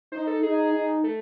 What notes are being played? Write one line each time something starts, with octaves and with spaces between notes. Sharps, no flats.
D#4 C5
A4
D#4 G#4
D#4
A3